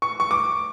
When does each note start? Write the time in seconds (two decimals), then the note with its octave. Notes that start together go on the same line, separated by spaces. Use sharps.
0.02 C#6
0.20 C#6
0.31 D6